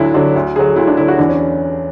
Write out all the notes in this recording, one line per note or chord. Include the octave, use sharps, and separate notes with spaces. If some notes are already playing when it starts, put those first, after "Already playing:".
Already playing: D2 D3 F#3 D4 E4
D3 F#3 D4
D2
D3 F#3 G#4
D2 E4
D4
D3 F#3 E4
F#4
E2 D4
C#4